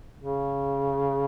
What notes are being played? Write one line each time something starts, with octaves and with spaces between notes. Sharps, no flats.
C#3